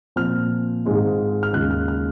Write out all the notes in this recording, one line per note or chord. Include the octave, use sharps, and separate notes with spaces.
A#2 F3 C4 F6
G#2 D#3 G#3 C4 F4
F6
D#2 C#3 G#3 C#4 F4 F#6
F6
F6